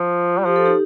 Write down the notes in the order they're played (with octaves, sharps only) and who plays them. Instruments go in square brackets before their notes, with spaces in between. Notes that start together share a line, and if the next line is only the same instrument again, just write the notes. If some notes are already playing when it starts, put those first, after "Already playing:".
Already playing: [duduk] F3 [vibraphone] F4
[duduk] G3
[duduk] F3 [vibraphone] G4
[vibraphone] A4
D#4 G4